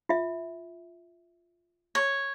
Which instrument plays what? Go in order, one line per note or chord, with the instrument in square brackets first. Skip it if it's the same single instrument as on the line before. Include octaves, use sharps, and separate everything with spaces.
[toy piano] F4 E5
[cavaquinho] C#5